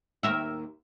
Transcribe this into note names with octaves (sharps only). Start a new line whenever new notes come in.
D#2 A#4 E5